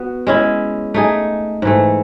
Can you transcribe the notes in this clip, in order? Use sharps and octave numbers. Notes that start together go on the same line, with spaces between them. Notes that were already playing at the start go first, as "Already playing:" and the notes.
Already playing: B3 F#4
G#3 C#4 E4
A3 D#4 G#4
G#2 E3 A3